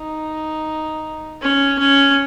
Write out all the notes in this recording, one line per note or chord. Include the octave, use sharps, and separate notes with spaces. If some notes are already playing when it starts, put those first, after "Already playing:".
Already playing: D#4
C#4
C#4